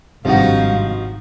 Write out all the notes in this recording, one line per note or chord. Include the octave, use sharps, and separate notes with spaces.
G#1 G2 C3 F3 G#3 D#4 F#4 F5